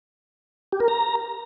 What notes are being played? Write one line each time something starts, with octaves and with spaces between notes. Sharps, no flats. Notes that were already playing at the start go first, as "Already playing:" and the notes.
G4
A#4
A#5